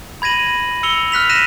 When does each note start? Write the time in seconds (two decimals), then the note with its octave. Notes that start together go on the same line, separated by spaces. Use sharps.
0.22 B5 G#6 A#6 D#7 F#7
0.83 E6 C#7 F7 G7
1.12 F6 F#6 B6 F7
1.30 F6 F#6 A#6 B6 D#7 E7